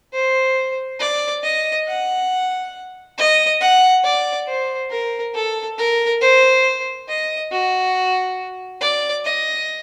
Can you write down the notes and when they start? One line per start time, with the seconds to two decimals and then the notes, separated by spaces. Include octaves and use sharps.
0.13 C5
0.99 D5
1.43 D#5
1.87 F#5
3.18 D#5
3.60 F#5
4.04 D5
4.47 C5
4.91 A#4
5.34 A4
5.78 A#4
6.22 C5
7.09 D#5
7.52 F#4
8.81 D5
9.25 D#5